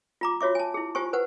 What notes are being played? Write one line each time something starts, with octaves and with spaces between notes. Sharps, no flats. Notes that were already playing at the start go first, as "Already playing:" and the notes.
F4 A#5 D6
F4 F#4 C#5 E5 D6
G#5 A5
E4 G#4
F4 G4 C5 G#5 C#6
B4 C5 F#5